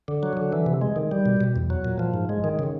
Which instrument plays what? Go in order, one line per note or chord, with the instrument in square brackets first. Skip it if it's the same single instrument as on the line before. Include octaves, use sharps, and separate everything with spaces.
[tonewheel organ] D3
F#3
D3
E3
C3
G#3
D#3
G3
B2
B2
E2
F#3
A#2
F3
G#2
G#3
D#3
C#3